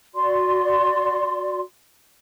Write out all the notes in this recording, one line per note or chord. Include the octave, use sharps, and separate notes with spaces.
F#4 D5 C6